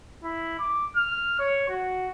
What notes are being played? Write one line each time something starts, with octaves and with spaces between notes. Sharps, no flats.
E4
D6
F6
C#5
F#4